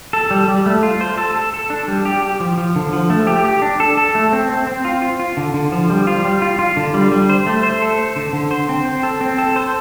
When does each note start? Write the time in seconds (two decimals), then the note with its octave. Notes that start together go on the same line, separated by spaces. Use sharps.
0.13 A4
0.31 G3
0.48 G3
0.66 A3
0.83 F4
1.01 C5
1.18 A4
1.36 A4
1.54 A4
1.70 D4
1.88 G3
2.05 G4
2.22 G4
2.40 F3
2.58 F3
2.76 D3
2.93 F3
3.10 A3
3.27 G4
3.45 G4
3.62 D4
3.80 A4
3.97 A4
4.15 A3
4.33 C4
4.49 C4
4.67 C4
4.85 F4
5.02 F4
5.19 F4
5.37 D3
5.54 D3
5.72 F3
5.90 G3
6.07 F4
6.25 G3
6.42 F4
6.59 F4
6.77 D3
6.94 G3
7.12 G3
7.29 C5
7.47 A3
7.63 C5
7.82 A4
7.98 C5
8.16 D3
8.33 D3
8.51 C5
8.69 C4
8.85 C5
9.03 A4
9.21 C4
9.38 A4
9.56 C5